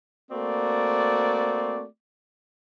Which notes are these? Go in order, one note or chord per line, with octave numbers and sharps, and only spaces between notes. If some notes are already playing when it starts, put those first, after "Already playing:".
A3 A#3 C4 F#4 D5